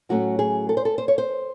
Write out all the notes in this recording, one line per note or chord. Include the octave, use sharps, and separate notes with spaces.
A2 F#3 A3 C#4 F#4
G#4
A4
C5
A4
C5
C#5
C5